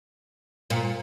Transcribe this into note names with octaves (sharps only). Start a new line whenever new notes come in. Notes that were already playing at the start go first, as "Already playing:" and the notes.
A#2